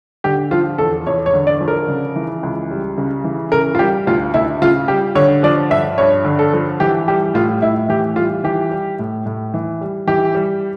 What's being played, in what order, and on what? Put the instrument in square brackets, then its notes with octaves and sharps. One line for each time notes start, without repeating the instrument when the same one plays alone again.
[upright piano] D3 G4
F3 F4
E2 A4
E2 C#5
C#5
D3
D5
F3
A#4
C#3
E3
C#2
G3
C#3
E3
C#3 A#4
F4
G3 G4
D2 F4
D2 E4
C#3 F4
G3 G4
D3 C#5
F3 D5
G2 E5
G2 C#5
D3
A4
F3
E3 G4
G3 G4
A2 F4
A2 E4
E3 G4
G3 F4
E3 G4
G3
A2
A2
E3
G3
E3 G4
G3